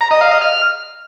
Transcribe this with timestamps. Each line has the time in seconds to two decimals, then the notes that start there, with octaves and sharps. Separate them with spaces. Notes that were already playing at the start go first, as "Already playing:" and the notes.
0.01 A#5
0.11 D#5
0.21 F5
0.31 D#5
0.41 F6